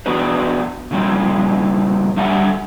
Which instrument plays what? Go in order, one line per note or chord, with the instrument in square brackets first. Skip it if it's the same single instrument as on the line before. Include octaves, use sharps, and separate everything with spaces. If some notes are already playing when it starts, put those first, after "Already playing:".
[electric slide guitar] E3 B3 D4 F#4 B4 C5
A#2 C#3 F3 G3 C4 C#4
D3 G3 E5 F#5 G#5